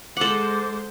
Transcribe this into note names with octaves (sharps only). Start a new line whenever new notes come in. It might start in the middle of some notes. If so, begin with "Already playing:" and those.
G#3 A4 C5 F#5 D6